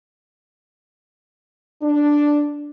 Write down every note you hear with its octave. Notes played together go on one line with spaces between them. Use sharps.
D4